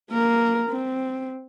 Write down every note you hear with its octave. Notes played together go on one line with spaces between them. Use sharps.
A#3 A#4
C4